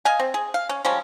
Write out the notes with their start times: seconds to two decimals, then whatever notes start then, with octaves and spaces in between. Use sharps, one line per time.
0.05 D#5 F5 G#5
0.20 C4
0.34 G#4
0.54 F5
0.69 C#4
0.85 F3 G3 G#3 C#4